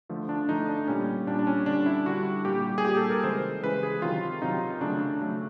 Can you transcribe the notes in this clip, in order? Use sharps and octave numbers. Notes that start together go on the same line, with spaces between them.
D3 F3 A3
D4
D3 F3 A3 D#4
D4
A#2 G3 C#4
A#2 G3 D4
D4
C#4
D3 G3 D4
E4
D3 G3 F#4
A#2 G3 G4
G#4
A#2 G3 G4
A4
A#4
C#3 E3 G#3 C5
C#3 E3 G#3 B4
G#4
C3 D#3 F#3 F4
C3 D#3 F#3 D#4
C#3 F#3 A3 D4
C#3 F#3 A3